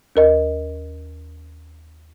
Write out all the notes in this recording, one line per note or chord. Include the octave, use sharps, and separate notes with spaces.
D#2 A#4 D#5